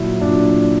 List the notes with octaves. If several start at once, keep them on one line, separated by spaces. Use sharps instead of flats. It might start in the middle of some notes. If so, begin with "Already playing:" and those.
Already playing: A#2 F#3 E4
A#2 D4